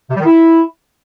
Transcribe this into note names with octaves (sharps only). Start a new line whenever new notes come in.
C3
G3
D#3
E4